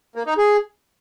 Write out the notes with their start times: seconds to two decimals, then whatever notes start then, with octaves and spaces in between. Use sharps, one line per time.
0.16 A#3
0.26 D#4
0.37 G#4